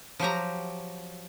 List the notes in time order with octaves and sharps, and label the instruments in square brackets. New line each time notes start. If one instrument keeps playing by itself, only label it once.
[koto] F3 F#3 G4 A#5